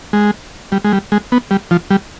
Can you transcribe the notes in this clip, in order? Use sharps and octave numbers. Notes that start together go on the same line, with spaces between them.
G#3
G3
G#3
G3
G#3
B3
G3
F3
G3